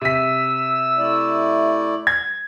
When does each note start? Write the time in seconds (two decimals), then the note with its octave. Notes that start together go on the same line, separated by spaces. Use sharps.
0.01 C3 E6 B6
0.98 A3 E4 D5
2.07 G#6